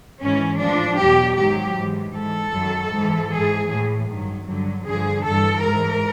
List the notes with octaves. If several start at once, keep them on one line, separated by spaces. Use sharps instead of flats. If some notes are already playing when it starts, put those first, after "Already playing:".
G#2 E3 C#4
A2 F3 D4
E2 B2 F#3 G4
G#2 D#3 F#3 G4
G#2 E3
G#2 E3 A4
F#2 D#3 F#3
G#2 E3
G#2 E3 G#4
A2 E3
G2 D#3 F#3
G2 D3 F#3
G2 D3 F3 G#4
G2 E3 A4
G#2 E3 A#4